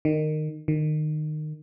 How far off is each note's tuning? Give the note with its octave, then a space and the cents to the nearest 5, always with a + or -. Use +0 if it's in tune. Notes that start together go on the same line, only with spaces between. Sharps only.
D#3 -20
D#3 -25